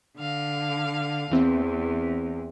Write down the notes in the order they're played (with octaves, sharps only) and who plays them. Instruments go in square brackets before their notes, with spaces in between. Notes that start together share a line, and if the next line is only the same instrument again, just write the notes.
[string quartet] D3 F5
[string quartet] E2 [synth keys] E3 C4